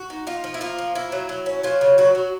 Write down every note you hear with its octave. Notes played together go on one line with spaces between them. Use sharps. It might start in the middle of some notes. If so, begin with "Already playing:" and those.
Already playing: F#4
D#4
D#4 F4
F3
E4
A#3 F4
F3
A#3 E4
F#3
F#3
C#4
F#3 F4
C#3
F#3 F#4
F#3